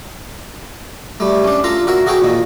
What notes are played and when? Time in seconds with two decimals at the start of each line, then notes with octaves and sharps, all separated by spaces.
1.20 G3 A3
1.44 C#4 D4
1.64 F4 A4 A#5 C6
1.87 F#4 A#4 E5
2.07 F#4 G#4 A4 C#5 G5
2.21 A#2 D#3